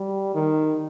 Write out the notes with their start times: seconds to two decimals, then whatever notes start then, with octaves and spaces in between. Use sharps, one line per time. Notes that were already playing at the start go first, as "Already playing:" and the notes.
Already playing: G3
0.35 D#3